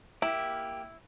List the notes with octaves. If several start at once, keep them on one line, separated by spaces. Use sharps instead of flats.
A#3 E4 G4